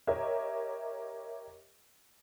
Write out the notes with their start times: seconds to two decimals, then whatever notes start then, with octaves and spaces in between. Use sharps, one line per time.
0.07 G4 A#4 C#5 D#5 E5